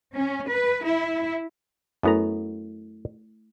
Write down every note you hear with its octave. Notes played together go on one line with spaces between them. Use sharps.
C#4
B4
E4
F#2 A3 B3 E4 A4 A#5